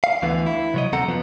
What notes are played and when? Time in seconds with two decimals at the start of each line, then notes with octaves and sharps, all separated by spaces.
0.04 F5
0.22 D2 D3 E3 B3
0.46 E4
0.74 C3 F#3 D#5
0.93 D#2 C3 C4 A4 F#5 A#5
1.08 F#2 F3 B3